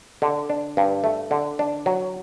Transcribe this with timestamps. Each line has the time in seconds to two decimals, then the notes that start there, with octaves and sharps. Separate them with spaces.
0.22 D3
0.50 D4
0.77 G2
1.04 A3
1.31 D3
1.59 D4
1.86 F#3